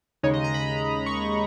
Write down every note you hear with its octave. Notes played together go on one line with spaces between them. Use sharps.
D#2 C#3 G#3 D#4 C#5
D#5
A#5
B5
C#6